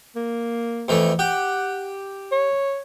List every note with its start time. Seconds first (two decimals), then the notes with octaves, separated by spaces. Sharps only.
0.16 A#3
0.88 F2 E3 A3
1.19 G4 F#5
2.32 C#5